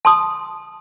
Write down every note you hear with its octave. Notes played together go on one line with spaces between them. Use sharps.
A5 C6 D#6